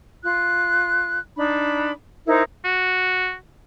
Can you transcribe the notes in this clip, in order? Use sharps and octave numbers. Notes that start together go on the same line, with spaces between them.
F4 F#6
D4 D#4 B5
D#4 E4 A#4 C5
F#4